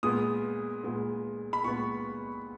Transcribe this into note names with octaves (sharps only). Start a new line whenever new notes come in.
A#2 G#3 B3 D#6
A#2 G#3 B3
B5
A#2 G#3 B3 C#6